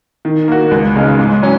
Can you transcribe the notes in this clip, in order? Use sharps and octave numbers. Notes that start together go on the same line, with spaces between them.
D#3
A#3 F#4
C#2
C#3 G#3 D#4
G#2
F#3 C#4